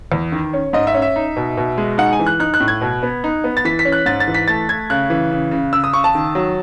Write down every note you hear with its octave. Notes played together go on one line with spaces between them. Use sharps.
E2
D#3
C#4
G#2 D#5
E5
C#4
E5
D#4
B2
B2
G#3
D#4 F#5
G#5
E3
F#6
D#4 F#6
F#6
A2
G#6
B2
B3
D#4
B3
A6
E3 B6
B6
C#4
F#6
G#2 A6
A6
E3
B6
A3 A6
A3 G#6
C#3 F#6
E3
C#3
C#3
C#3 E6
D#6
C#3 C#6
A5
D#3
F#3